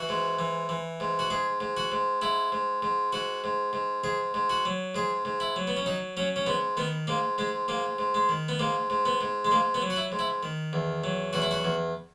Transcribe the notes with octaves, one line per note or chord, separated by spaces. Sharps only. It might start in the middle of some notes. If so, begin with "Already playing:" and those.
Already playing: E3 F#4
G#2
E3
E3
G#2
F#4
G#2 G#4
G#2
F#4
G#2
G#2 E4
G#2
G#2
G#2 F#4
G#2
G#2
G#2 G#4
G#2
F#4
F#3
G#2 G#4
G#2
E4
F#3
B3
C#4
F#3 D#4
F#3 C#4
C#4
G#2 B3
D#3 B3
G#2 A#3
G#2 G#3
G#2 A#3
G#2
G#3
D#3
B3
G#2 A#3
G#2
B3
G#2
G#3
G#2 A#3
B3
F#3
F#4
E4
G#2
E4
D#3
E2
F#3
E2 F#4
E4
F#4
E2